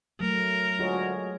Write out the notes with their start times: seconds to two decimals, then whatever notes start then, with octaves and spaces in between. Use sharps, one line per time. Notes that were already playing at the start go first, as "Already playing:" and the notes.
0.20 F#3 A3 A#4
0.79 D2 G#3 F4 F#4 G#4 C#5